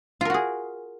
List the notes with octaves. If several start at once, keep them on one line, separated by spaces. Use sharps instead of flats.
F4 F#4 G#4 A#4